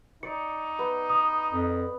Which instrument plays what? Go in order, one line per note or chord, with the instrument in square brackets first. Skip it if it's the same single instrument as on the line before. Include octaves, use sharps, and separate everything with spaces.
[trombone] D#4 [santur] D5 [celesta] C#7
[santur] B3
[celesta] D#6
[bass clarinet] F2